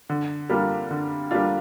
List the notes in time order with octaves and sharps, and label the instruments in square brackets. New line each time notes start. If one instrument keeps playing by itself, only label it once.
[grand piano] D3
G3 A#3 D4 F4
D3
G3 A#3 D4 F4